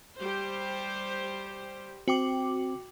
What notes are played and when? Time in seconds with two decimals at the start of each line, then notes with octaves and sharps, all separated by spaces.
0.18 G3 G4 C5
2.08 C4 F#4 G5 D6